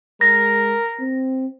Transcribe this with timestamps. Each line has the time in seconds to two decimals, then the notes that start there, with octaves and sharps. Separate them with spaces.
0.21 G#3 A#4 A#6
1.00 C4